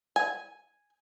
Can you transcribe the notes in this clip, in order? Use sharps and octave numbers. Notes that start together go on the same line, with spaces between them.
G#5